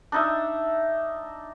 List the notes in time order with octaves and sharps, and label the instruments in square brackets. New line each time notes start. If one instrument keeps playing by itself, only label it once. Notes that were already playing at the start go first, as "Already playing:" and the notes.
[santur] D4 D#4 E5